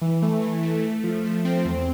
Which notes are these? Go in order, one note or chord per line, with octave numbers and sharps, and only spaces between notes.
E3
A3
E3
A3
A3
F3
A3
C4
E2